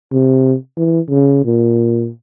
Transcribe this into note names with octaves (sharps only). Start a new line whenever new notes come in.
C3
E3
C#3
A#2